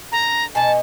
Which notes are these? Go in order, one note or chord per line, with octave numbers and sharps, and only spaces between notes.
D3 A#5
B2 B3 G#5 A5